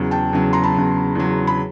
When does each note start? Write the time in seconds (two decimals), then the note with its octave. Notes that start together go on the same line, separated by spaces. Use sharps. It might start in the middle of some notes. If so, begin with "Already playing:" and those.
Already playing: E2 C#3 F#3
0.11 G5 A5
0.33 E2 C#3 F#3
0.53 A#5 C6
0.63 A5 B5
0.74 E2 C#3 F#3
1.15 E2 C#3 F#3
1.47 B5